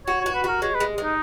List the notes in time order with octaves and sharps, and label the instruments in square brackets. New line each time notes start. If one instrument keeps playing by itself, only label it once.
[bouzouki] F#4 [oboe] C#5
[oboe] C#5
[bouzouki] F#4
[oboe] B4
[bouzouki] F#4 [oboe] A#4
[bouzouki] G#3 [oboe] C#5
[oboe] B4
[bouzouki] G#3
G#3
[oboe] D#4